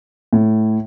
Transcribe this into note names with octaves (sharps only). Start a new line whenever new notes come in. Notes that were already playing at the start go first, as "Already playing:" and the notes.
A2